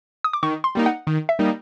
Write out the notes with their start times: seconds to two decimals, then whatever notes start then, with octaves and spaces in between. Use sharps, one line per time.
0.24 D#6
0.33 D6
0.43 D#3 C#6
0.64 C6
0.75 G3 A#3 D#4
0.86 F#5
1.07 D#3
1.29 E5
1.39 G3 A#3 D#4